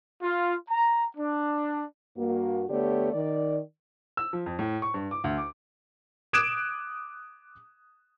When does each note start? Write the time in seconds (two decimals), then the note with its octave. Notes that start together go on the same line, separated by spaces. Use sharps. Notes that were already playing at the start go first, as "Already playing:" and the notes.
0.22 F4
0.69 A#5
1.17 D4
2.17 G2 A#3 F#4
2.70 D3 A3 B3 G4 C#5 D5
3.13 D#3 D5
4.17 E6
4.33 F3
4.46 F2
4.59 A2
4.82 C#6
4.94 G2
5.11 D6
5.24 D2
5.38 D6
6.33 D6 D#6 F#6 G#6 D7 E7